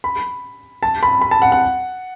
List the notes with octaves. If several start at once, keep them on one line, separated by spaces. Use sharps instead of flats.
B5
A5
B5
B5
A5
F#5
F#5